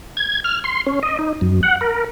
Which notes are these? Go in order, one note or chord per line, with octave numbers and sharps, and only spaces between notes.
G#6
F6
C6
C#4
D#5
D#4
F#2
F#5
A#4